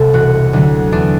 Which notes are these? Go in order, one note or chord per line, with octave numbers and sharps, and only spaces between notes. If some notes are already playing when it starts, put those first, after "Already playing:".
Already playing: C2 C3 A4
E1 F#4
D2 D3 F#3 A3
E2 D4